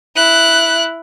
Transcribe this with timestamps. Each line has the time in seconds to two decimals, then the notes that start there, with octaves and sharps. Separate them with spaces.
0.16 E4 F#6